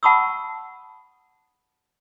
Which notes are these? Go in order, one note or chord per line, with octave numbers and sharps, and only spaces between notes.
F#5 A5 B5 C#6 D#6 E6